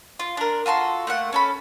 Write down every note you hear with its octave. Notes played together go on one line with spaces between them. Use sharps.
F4
D4 A#4
F4 F#4 A4 C6
A3 A#3 F#5
C#4 A4 B5